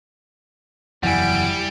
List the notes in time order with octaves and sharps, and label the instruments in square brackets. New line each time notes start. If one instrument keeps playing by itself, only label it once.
[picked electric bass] F#1 E2 F#3 [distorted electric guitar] G3 [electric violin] E4 D7 [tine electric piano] F#5 G#5